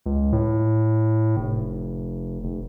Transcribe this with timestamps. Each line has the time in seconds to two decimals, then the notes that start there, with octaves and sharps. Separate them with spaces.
0.06 C#2
0.33 A2
1.37 F1
2.44 F1